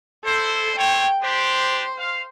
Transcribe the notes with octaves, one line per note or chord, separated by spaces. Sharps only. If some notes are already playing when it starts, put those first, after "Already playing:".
E4 A4 C5
A3 C5 C#5 G5
D4 G4 C5
F5